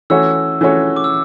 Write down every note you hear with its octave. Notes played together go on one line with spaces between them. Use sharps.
E3 A3 C#4 F#4 C#5 E6
E3 A3 C#4 F#4 C#5
D6
E6